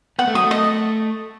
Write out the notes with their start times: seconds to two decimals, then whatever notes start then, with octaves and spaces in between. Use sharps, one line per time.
0.19 B3 F#5
0.27 A3
0.34 F#3 D#6
0.43 A3
0.51 D#5